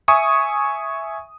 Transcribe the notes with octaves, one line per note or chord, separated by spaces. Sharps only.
E5 G#5 C#6 D#6